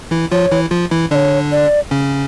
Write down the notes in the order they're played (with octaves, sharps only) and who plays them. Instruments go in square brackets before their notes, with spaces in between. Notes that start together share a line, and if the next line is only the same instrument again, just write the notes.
[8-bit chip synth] E3 E4
[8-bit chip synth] F3 F4 [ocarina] C#5
[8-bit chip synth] E3 E4
F3 F4
E3 E4
[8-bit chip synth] D3 D4 [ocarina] C#5 D5
[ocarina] D5
[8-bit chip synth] C#3 C#4